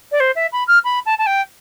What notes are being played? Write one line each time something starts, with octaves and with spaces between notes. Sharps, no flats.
D5
C5
E5
B5
F6
B5
A5
A5
G5